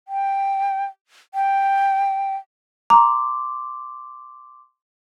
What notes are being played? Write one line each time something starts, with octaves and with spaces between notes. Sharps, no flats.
G5
G5
A#5 C6 D6